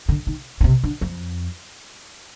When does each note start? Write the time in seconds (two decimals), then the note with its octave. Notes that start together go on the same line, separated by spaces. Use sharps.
0.09 D3
0.27 D#3
0.61 D3
0.64 C3
0.83 D3
1.01 F2